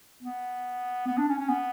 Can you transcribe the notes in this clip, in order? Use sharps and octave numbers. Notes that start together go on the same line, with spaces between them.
B3
B3
D4
C#4
C#4
B3